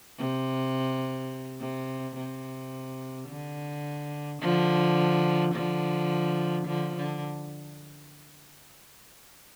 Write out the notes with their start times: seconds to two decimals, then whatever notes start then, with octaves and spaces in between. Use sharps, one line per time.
0.19 C3
1.60 C3
2.16 C3
3.29 D3
4.41 D3 F3
5.55 D3 F3
6.67 D3 F3
6.96 D3